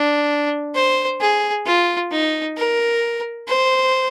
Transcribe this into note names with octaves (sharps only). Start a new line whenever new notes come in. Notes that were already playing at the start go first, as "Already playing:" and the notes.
Already playing: D4
C5
G#4
F4
D#4
A#4
C5